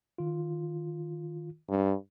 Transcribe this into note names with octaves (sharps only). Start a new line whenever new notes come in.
D#3 F4
G2